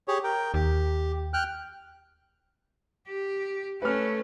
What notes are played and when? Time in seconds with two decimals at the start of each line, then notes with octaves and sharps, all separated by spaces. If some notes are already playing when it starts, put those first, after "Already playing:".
0.08 G4 G#4 C#5
0.24 A#4 G5
0.54 D#2 G4
1.33 G5 F6 F#6
3.08 G4
3.82 A3 C#4 B4 F6